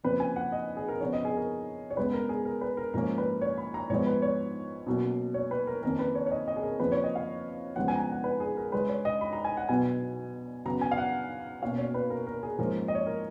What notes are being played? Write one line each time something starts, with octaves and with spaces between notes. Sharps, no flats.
F2 C#3 F3 A#3 B4
G#5
F#5
D#5
G#4
A#4
C#3 F3 B3 C#5
D#5
G#4
A#4
C#5
C#3 G#3 B3 B4
A#4
G#4
A#4
B4
A#4
G#2 F3 A#3 C#4 A#4
B4
C#5
B5
A#5
G#2 F3 G#3 B3 C#5
B4
C#5
B2 F#3 A#3 C#4
C#5
B4
A#4
F2 D#3 A#3 C#4 A#4
B4
C#5
C#5
D#5
D#5
G#4
A#4
F2 C#3 F3 A#3 B4
C#5
D#5
F5
C#3 F3 G#3 B3 F#5
G#5
A#5
G#5
F#5
B4
G#4
A#4
C#3 G#3 C#4 B4
C#5
D#5
B5
A#5
G#5
F#5
B2 F#3 B3 G#5
C#3 F#3 B3 A#5
G#5
F5
F#5
B2 A#3 C#4 F5
C#5
B4
A#4
A#4
G#4
G#2 F3 A#3 C#4 A#4
D#5
C#5
A#4